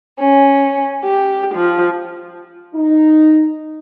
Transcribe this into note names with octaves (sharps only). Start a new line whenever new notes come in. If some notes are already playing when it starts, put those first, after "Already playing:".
C#4
G4
F3
D#4